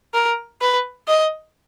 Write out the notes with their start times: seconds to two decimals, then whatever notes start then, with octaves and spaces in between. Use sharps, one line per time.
0.14 A#4
0.61 B4
1.07 D#5